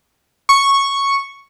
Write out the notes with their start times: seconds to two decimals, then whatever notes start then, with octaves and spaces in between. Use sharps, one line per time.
0.49 C#6